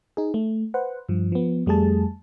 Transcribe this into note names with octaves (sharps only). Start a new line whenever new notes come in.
D#4 G#4
A3
B4 C5 F#5
G2 F3
F3 B3
F2 G3 A3 G#4 A5